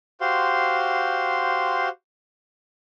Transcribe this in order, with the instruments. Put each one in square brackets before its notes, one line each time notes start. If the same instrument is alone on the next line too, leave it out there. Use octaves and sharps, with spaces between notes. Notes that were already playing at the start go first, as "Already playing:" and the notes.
[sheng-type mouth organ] F#4 G4 C5 F5 C6